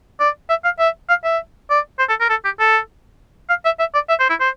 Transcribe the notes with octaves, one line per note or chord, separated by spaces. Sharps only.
D5
E5
F5
E5
F5
E5
D5
C5
A4
A#4
A4
G4
A4
F5
E5
E5
D5
E5
C5
E4
C5